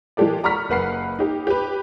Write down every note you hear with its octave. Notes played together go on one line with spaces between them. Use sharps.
E3 G#3 A#3 G4 A4 D5
D5 A#5 B5 C#6 F6 B6
F#1 A#3 B4 F#5 B5 C7
D#4 G4
G4 B4